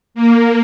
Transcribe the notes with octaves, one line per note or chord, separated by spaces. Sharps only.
A#3